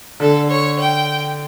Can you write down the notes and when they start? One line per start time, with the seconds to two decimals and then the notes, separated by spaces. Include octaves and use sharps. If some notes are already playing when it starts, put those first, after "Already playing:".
0.20 D3 A4
0.50 C#5
0.79 G5